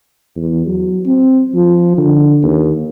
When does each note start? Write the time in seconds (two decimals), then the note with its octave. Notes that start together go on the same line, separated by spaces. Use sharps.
0.36 E2
0.67 F#3
1.06 C4
1.55 F3
1.98 D3
2.43 D#2